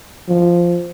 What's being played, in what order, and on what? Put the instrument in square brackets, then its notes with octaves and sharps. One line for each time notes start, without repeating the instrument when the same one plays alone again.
[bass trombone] F3